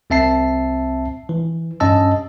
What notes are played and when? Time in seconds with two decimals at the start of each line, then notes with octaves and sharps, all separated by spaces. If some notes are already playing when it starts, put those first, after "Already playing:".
0.10 C2 C4 E5 A5 C7
1.29 E3
1.80 G2 C#4 D#5 A5 E6